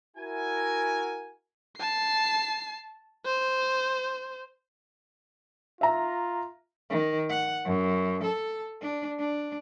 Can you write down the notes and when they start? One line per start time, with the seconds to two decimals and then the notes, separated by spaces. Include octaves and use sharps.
0.17 E4 F#4 A#4 G#5
1.78 A5 C7
3.25 C5
5.81 F4 E5 A#5
6.90 D#3
7.29 F#5
7.65 F#2
8.23 A4
8.81 D4
9.19 D4